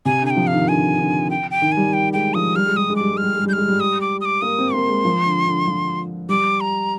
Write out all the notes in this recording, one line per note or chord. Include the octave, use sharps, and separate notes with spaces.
C3 G#5
D3 G#5
G5
F3
F5
D#3
D3 G#5
D3
G5
G5
D#3
G3 G#5
G5
G#3 G5
F3 D#6
G3 F6
G#3
G3 D#6
G#3
G3 D6
G#3
F6
G3
G#3
G3 G6
G#3 F6
G3
D#6
D6
D#6
D6
A#3 D#6
C4
A#3 C6
G#3
F3
D3
D3
F3
G3 D6
A#5